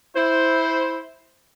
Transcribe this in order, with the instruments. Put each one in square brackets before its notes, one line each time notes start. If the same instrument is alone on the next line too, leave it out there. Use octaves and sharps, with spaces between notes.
[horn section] E4 C5